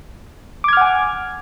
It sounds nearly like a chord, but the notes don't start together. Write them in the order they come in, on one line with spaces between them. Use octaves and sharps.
D6 G#6 F6 F#5 G#5